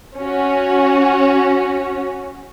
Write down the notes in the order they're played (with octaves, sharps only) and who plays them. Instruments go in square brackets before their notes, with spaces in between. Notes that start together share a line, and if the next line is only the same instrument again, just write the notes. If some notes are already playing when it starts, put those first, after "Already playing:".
[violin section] C#4 F#4